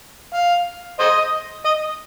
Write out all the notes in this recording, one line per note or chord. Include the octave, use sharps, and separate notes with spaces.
F5
C5 D#5
D#5